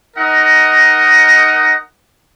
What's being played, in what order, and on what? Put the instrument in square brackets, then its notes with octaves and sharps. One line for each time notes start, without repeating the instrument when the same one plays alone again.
[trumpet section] D#4 A#4 D#5 F#5